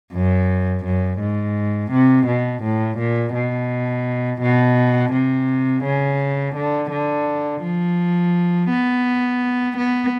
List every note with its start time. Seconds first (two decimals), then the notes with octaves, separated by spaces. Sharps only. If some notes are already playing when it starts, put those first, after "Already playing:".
0.13 F#2
0.85 F#2
1.20 G#2
1.92 C3
2.27 B2
2.63 A2
2.99 A#2
3.34 B2
4.41 B2
5.13 C3
5.84 C#3
6.56 D3
6.91 D3
7.62 F3
8.70 B3
9.77 B3